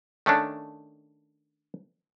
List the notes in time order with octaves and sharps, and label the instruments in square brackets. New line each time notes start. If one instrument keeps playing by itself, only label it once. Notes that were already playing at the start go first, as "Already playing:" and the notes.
[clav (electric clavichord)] D#3 A3 C#4 D4